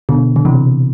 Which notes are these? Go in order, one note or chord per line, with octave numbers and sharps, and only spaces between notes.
B2 D3
D3
C3 E3